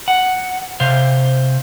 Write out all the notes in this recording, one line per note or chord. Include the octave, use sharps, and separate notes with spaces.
F#5
C3 C5 F5